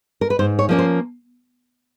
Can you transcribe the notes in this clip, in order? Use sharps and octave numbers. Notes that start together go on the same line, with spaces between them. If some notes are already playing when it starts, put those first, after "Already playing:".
A#4
B4
G#2 C5
C#5
F3 A#3 C#4
C5